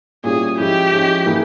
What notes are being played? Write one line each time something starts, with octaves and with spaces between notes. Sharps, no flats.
A#2 G3 C#4 E4 G#4
F3 G#3 C#4 E4 G4
F3 G#3 C#4 E4
E3 A#3 E4 G#4